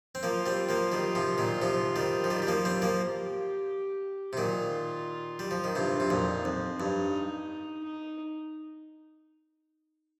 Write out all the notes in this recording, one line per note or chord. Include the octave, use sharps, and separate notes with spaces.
C4
F3 A#3 F4
G3 C4
F3 A#3
D#3 G3
C3 F3
A#2 D#3
C3 F3
D#3 G3
F3
D#3 G3
G3
F3 A#3
G3 C4
F3 A#3
G4
C3
A#2 D#3 F4
G3
F3
D#3
G2 C3 F4
C3
F2 A#2 D#4
F2 C4
G2 D#4
D#4